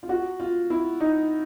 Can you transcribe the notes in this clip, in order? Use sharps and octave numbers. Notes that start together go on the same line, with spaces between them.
F4
F#4
F4
E4
D#4